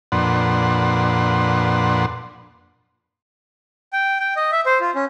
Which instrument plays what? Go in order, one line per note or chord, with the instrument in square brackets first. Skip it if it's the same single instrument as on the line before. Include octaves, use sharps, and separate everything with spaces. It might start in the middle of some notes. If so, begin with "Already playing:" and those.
[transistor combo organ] F2 A#2 D4 B4 F#5 C6
[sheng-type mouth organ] G5
G5
D#5
E5
C5
F4
C#4